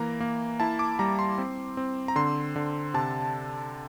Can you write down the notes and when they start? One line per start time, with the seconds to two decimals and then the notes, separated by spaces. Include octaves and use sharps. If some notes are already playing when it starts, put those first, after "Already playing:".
Already playing: E3 A#3 A#5
0.20 A#3
0.60 E4 A5
0.79 D6
0.99 G3 A#5
1.19 C6
1.38 C4
1.77 C4
2.08 A#5
2.16 D3 C6
2.56 D3
2.94 C3 A5